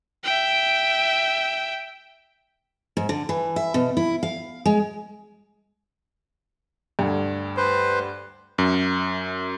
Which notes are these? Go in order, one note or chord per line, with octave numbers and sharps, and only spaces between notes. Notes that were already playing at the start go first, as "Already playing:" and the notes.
E5 G5
G#2
D3
E3
E5
B2
E4
F5
G#3
D2 G2
B4 C5
F#2